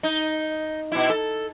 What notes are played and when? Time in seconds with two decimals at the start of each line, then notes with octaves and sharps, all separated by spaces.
0.03 D#4
0.92 B2 E4
1.10 A4